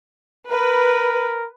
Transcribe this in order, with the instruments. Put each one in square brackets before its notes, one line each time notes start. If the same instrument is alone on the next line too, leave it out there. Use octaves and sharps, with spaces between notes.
[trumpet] A#4 [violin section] B4